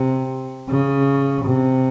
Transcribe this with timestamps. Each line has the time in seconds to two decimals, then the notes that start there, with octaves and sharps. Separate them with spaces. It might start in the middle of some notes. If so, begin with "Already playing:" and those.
Already playing: C3
0.70 C#3
1.45 C3